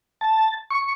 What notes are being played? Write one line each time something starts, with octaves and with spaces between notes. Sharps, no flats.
A5
C#6